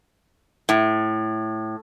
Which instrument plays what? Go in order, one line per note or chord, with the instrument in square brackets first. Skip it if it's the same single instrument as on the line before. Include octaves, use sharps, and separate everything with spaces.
[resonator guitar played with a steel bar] A2